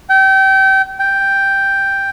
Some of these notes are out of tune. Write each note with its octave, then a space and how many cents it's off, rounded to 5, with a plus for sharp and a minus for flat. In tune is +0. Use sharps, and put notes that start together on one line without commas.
G5 -30
G5 +0